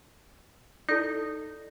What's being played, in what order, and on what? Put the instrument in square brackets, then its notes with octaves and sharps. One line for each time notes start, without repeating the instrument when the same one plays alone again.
[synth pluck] D#4 [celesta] E4 A4 D5